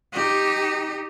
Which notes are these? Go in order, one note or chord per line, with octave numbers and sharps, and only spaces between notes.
D#4 G4